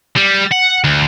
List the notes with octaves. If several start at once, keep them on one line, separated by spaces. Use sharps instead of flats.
G3
F#5
D2